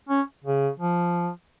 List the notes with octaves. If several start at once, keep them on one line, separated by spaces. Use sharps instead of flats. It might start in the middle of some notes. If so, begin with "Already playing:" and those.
C#4
C#3
F3